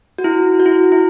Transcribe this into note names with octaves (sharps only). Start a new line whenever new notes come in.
F#4
E4
F#4
E4
E4